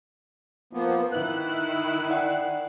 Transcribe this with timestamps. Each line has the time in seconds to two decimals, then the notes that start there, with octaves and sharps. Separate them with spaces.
0.73 F3 A#3 B3
1.13 D#3 E4 F#6
2.10 D5 F#5 G5